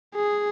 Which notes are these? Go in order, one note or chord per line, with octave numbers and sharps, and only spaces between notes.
G#4